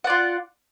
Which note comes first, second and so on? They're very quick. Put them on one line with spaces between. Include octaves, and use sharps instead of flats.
F#5 D5 F4